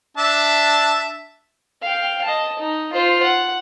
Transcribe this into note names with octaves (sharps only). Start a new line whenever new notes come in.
D4 E5 A5
F5 G5
D#5 A5
D#4
F4 C5
F#5